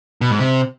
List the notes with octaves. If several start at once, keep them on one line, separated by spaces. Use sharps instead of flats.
B2
G#2
C3